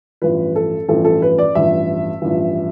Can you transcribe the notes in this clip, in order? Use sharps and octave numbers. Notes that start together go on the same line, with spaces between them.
A1 G2 F3 B4
A4
A1 G2 F3 A4
A4
B4
D5
A1 G2 F3 E5
A1 G2 F3